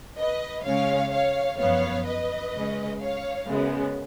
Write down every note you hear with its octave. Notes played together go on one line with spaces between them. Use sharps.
B4 D#5
C#3 G#3 C#4 C#5 F5
C#5 F5
F#2 F3 B3 C#5 F5
B4 D#5
C#3 G#3 C#4
C#5 F5
F#2 C#3 G#3 B3